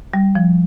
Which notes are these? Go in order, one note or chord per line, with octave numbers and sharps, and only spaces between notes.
G3
F3